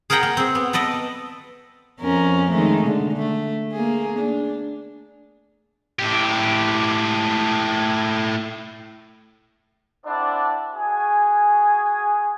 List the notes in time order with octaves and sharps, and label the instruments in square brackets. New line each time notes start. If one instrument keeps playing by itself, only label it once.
[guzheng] G#4 A#4 C5 F#5 G5 A#5
A#3
C4 G#4
B3
A4 B4 D5 D#5
[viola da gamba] F2 C#4 A#4
D#3 G#3 A3
D3
A3
A#3 G#4
D4
[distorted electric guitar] A2 G4
[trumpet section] C4 D4 E4 A4 D5 F#5
F#4 G#4 G#5